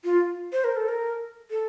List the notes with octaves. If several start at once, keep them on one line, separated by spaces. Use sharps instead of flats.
F4
C5
A#4
A4
A#4
A4